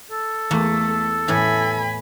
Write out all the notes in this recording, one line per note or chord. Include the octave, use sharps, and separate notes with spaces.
A4
E2 A3 A#3
A2 E3 G#5 B5